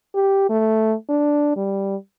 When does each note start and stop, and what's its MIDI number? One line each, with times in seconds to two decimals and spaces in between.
0.14 0.49 67
0.50 0.94 57
1.09 1.56 62
1.56 1.96 55